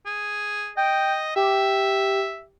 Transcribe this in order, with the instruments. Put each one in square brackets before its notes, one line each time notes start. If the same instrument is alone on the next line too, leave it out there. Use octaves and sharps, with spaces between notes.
[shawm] G#4
[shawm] D#5 [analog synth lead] G5
[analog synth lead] G4 [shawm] E5